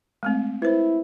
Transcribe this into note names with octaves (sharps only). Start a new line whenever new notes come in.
G#3 A3 C4
E4 B4 C5